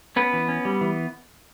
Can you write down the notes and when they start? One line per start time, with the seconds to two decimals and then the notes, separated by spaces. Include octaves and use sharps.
0.16 B3 C#4 B4
0.33 E3
0.48 C#4
0.65 G3
0.81 E3